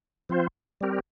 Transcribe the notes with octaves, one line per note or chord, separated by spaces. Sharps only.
F3 C4 F4 C5
G3 C4 G4 A#4